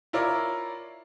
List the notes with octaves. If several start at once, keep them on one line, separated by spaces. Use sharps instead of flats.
E4 F4 A#4 C#5 D5